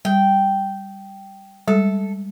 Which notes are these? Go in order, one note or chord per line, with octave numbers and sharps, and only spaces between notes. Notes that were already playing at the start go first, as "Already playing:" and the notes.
G3 G5
G3 G#3 A4